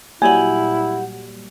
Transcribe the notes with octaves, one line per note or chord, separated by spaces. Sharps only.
A#2 F#3 G3 E4 G4 F#5 G#5